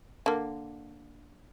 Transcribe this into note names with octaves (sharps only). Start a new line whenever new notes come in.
D3 A#3